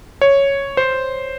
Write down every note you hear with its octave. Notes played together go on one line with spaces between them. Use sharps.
C#5
C5